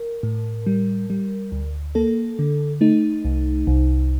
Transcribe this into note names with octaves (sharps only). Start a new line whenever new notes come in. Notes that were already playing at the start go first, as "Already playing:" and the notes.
Already playing: A#4
A2
G3
G3
D2
A#3 A4
D3
A3 D#4
C2
C2